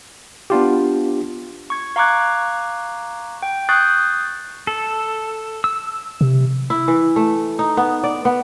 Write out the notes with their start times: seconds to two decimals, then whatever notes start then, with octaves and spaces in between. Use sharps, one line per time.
0.50 B3 D4 F4 G4
1.70 C#6 G#6
1.96 F5 A#5 C#6 D6 F#6 G#6
3.43 G5
3.69 C#6 D#6 F#6 G6 A6 C7
4.67 A4
5.64 E6
6.21 C3
6.70 E4
6.88 E3
7.16 A3
7.59 D#4
7.77 B3
8.04 D5
8.25 B3